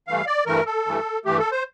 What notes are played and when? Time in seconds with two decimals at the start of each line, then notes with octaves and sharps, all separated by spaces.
0.07 G2 E3 A3 F5
0.27 D5
0.46 G2 E3 A3 A#4
0.66 A4
0.86 G2 E3 A3
1.25 G2 E3 A3 G4
1.39 A4
1.52 C5